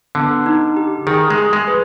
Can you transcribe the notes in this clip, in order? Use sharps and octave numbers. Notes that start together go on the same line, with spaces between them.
D3 B3
D#4
G4
D#3 G#4
G#3
G#4
G#3
B4